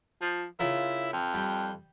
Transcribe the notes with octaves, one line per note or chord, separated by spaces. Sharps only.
F3
C#3 E4 F4 A#4
F2
G3 G4